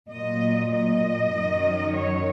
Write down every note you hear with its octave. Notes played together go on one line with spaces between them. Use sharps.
A#2 F#3 D#5
D#5
F#2 D#3 F#3
C#5